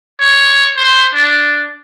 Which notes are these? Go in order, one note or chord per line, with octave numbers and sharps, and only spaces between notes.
C#5
C5
D4